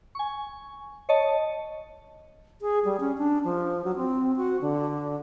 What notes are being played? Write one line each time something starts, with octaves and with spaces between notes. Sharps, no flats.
G#5 C#6
C#5 D#5 A5
G#4
G3
C#4
D4
F3
F#3
C4
F#4
D3